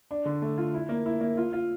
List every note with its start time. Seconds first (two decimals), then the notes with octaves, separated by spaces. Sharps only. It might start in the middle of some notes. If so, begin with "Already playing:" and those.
0.11 D4
0.25 D3
0.42 A3
0.58 F4
0.74 E4
0.89 A#3
1.06 E4
1.21 A#3
1.37 F4
1.53 F4